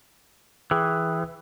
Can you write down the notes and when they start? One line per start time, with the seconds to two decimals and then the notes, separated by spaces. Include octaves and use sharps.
0.71 E3 G#4 G5 D#6